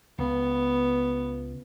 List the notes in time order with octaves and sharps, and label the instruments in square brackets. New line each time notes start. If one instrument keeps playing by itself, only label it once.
[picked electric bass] C#2 [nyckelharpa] B3